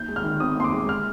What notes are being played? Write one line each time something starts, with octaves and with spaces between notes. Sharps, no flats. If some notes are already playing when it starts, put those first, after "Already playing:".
Already playing: D#2 G6
G#3
F6
D#3
C4 D#6
D#2 C6
D6
G#3
F6